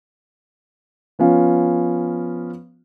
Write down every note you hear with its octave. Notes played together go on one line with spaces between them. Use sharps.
F3 B3 C#4 F4